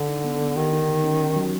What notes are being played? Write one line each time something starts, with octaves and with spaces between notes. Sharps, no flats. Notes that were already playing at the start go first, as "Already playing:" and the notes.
Already playing: D3
D#4
B3
B3
D#3 G4
D#4
D3
C#4
C#4
F#3